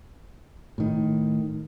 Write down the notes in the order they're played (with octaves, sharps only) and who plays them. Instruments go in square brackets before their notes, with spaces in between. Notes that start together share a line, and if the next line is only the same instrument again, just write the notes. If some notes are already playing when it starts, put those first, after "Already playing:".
[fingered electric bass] A2 D#3